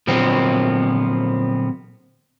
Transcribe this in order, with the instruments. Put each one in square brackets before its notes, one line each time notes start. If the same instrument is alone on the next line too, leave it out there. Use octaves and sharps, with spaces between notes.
[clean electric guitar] A#2 D3 F3 F#3 B3 C4